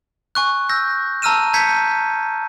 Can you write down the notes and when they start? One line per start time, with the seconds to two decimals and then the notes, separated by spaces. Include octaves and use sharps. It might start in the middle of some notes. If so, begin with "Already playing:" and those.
0.35 G#5 C#6 F#6
0.69 E6 G6 A#6
1.22 A5 A#5 E6 F6 D#7 E7
1.53 A5 A#5 G6 G#6 B6 C#7